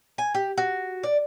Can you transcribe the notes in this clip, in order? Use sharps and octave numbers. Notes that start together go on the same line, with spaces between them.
G#5
G4
F#4
D5